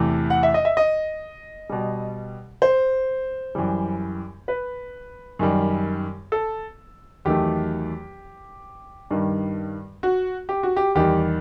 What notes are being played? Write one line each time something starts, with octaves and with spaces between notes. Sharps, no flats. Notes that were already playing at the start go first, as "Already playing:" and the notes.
Already playing: E2 C3 E3 A3
F#5
E5
D#5
E5
D#5
B2 G3
C5
F#2 E3 G3
B4
F#2 D#3 G3
A4
E2 D#3 F#3 A3 G4
G2 D#3 G3
F#4
G4
F#4
G4
E2 D#3 G3 G4